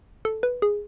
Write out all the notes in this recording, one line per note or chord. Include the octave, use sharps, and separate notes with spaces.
A4
B4
G#4